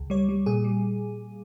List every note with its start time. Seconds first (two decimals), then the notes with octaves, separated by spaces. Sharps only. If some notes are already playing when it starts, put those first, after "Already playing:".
Already playing: C#2
0.10 G3 C#5
0.29 G3
0.46 A#2 G#4
0.64 G3